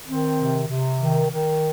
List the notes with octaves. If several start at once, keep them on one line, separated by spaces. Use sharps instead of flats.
D#3 C4
C3
C3
D#3
D#3